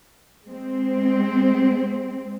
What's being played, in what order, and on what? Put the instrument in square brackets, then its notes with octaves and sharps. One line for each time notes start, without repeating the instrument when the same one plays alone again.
[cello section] G#3 C4